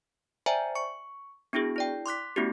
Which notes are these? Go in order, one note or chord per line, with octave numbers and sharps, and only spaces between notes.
C5 D5 E5 G5 G#5 A#5
C#6 C#7
B3 D4 E4 F#4 G#4
E4 D5 G5
C6 D6 F#6 B6
A3 B3 C#4 E4 F#4 G4